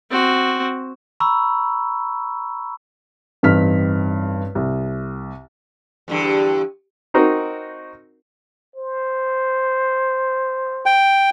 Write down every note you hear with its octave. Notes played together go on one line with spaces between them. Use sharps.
C4 F#4
A#5 B5 C#6 E6
A1 G2 C4 D#4 F6 B6
C2
E2 G2 D3
C4 D#4 F#4 A#4
C5
G5